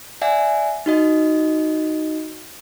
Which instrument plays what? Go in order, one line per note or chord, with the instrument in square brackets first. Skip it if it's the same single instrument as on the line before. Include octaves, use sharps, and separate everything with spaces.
[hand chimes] D5 E5 F#5 G#5
D#4 F#4 D#5